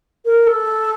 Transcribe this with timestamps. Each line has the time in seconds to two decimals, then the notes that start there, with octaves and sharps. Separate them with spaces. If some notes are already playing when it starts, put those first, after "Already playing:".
0.25 A#4
0.46 A4